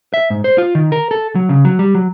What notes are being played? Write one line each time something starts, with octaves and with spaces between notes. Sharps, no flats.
E5
G#2
C5
F4
D#3
A#4
A4
F#3
C#3
F#3
G3
F#3